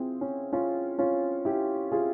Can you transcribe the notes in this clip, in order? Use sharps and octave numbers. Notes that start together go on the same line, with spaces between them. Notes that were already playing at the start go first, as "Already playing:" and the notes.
Already playing: C4 E4 F4 G#4
C#4
C#4 F4
C#4 F4
E4 G4
F4 G#4